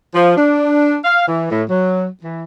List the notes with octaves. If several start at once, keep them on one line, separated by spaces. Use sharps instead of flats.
F3
D4
F5
E3
A2
F#3
E3